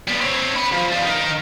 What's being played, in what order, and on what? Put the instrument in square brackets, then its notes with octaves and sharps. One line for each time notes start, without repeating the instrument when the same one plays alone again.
[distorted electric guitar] G3 B3
C4 C#5
F#5 B5
F3
F3 G3
D#4 A#4